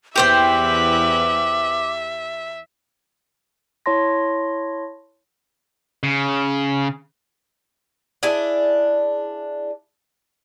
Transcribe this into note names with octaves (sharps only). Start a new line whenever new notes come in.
E2 E3 G4 B4 C5 E5 G5 D6
E4 C#5 A5 C6 A#6
C#3
D4 E4 G#4 D5